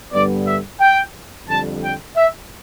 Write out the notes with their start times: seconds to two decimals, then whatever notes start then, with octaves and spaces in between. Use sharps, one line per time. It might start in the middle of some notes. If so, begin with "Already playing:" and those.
0.12 G2 D3 G3 B3 D5
0.46 E5
0.80 G5
1.48 F2 D3 G3 A5
1.82 G5
2.16 E5